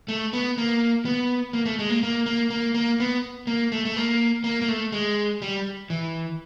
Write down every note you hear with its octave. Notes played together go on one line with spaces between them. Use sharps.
A3
B3
A#3
B3
A#3
A3
G#3
A#3
A#3
A#3
A#3
A#3
B3
A#3
A3
A3
A#3
A#3
A#3
A3
G#3
G3
E3